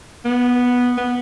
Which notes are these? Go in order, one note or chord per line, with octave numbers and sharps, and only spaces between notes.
B3
B3